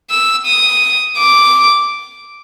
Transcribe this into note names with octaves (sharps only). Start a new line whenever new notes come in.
E6
D#6
D6